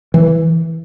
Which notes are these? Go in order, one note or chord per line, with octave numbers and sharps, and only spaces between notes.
E3